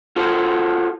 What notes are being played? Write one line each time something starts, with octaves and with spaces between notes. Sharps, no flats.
F4 F#4 A4 C5